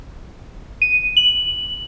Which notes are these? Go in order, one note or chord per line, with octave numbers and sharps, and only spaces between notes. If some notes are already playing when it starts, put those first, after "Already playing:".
D#7
F#7